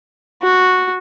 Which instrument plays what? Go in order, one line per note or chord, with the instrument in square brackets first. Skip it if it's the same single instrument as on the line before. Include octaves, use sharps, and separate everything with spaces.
[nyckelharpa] F#4